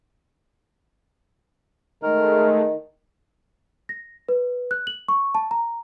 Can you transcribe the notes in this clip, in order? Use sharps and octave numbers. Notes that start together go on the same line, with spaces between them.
D#3 G#3 A3 A#4
A#6
B4
F#6
F#7
C#6
A5
A#5